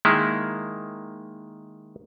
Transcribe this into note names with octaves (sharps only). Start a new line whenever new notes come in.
D#3 G#3 A#3 E4